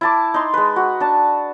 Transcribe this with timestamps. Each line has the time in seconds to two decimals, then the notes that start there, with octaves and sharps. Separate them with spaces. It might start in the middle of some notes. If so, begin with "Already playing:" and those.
0.01 E4 A5 D6
0.34 D#4 C6
0.54 G#3 B4
0.76 F#4
1.00 D4 A5